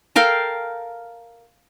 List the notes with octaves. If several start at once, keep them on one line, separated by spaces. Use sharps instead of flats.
A4 A#4 F5 G5